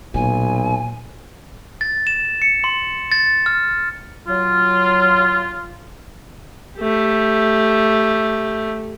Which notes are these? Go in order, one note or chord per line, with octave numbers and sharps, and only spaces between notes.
B1 A#2 G#5
A6
E7
C#7
C6
A6
F6
F#3 F4
A3 G4